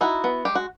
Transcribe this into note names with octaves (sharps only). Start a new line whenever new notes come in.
D#4 E4 F#4
B3
G#3 G4
F#4